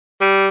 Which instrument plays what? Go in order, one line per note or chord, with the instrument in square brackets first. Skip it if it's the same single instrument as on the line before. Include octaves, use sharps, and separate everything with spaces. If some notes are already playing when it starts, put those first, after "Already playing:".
[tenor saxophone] G3